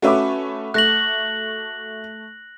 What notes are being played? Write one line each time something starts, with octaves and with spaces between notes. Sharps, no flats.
A3 C#4 F#4 B4 E5 D6
A3 F#6 A#6 F#7